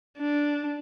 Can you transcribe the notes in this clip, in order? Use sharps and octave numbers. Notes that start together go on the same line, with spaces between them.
D4